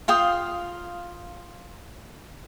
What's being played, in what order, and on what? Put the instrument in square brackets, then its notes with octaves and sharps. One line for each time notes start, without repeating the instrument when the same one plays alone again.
[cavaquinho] F4 F5 G5 D#6